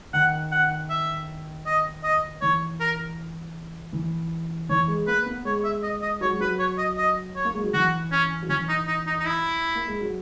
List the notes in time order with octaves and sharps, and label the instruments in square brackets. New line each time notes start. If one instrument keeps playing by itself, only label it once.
[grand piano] D#3 [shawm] F#5
[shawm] F#5
E5
D#5
D#5
[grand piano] E3 [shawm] C#5
[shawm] A#4
[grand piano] E3
[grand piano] E3 [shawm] C#5
[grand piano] G#3
[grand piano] A#3 [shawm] B4
[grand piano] B3
[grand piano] G#3 [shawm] C#5
[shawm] E5
D#5
D#5
[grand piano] F#3 [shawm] C#5
[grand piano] G#3
[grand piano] F#3 [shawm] B4
[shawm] C#5
D#5
D#5
C#5
[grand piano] A#3
G#3
F#3
[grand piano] E3 [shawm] F#4
[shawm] C#4
[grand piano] F#3
[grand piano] E3 [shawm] C#4
[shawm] D#4
D#4
D#4
D#4
E4
[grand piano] A#3
G#3
F#3